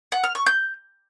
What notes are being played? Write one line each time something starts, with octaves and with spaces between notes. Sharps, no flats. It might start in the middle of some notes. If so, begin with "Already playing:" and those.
F#5
F6
C#6
G6